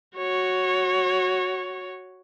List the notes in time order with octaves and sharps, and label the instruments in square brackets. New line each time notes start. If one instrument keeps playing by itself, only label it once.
[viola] F#4 C#5